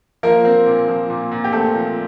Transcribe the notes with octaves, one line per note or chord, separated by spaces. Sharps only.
F3 A#3 A#4
C4
A#2
F3
A#2
A#2
G4
A3 C4 A4
F3